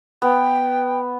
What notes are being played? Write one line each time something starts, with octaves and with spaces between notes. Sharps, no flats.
B3 G5